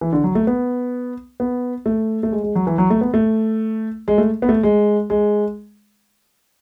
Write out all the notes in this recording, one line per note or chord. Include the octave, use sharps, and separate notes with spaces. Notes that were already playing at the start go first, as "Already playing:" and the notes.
E3
D3
F#3
A3
B3
B3
A3
A3
G#3
G#3
F#3
E3
F#3
A3
B3
A3
G#3
A3
B3
A3
G#3
G#3